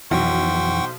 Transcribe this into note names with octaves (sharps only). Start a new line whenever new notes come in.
B1 F2 E3 C5 F#5 G5 C#6